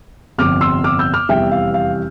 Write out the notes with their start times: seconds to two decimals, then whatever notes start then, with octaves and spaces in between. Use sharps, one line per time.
0.38 G1 F2 C3 D6 F6
0.61 C6 E6
0.84 D6 F6
0.99 E6 G6
1.14 D6 F6
1.29 F1 E2 E3 G3 E5 G5
1.52 F5
1.74 F5